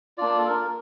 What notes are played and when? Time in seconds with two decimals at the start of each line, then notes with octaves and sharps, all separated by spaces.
0.18 A#3 D4 F4 D5
0.38 A4
0.47 A#4